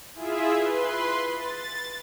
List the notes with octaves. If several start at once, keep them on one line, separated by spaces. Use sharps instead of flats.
E4 F4 G#4 E5
B4 C6
A6